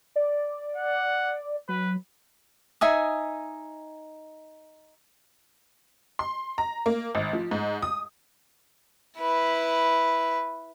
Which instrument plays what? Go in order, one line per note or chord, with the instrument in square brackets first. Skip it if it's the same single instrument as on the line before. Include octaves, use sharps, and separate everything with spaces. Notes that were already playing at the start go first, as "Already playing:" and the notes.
[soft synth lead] D5
[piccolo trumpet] F#5
[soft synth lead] F#3 [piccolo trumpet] B4
[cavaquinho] D#4 E5 G#5 D#6
[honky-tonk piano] C6
A#5
A#3
G#1
F3
G#2
D#6
[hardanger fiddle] E4 B4